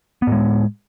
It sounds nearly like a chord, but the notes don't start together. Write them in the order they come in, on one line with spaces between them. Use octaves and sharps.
B3 A2 G#3